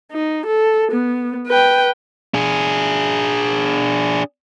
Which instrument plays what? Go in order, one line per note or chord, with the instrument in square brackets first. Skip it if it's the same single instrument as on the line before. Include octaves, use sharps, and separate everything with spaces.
[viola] D#4
A4
B3
B4 G5
[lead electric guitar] D4 G#4